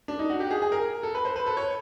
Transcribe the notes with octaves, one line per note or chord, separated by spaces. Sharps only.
D4
D#4
F#4
G4
G#4
G#4
A#4
A4
B4
C5
B4
A4
C#5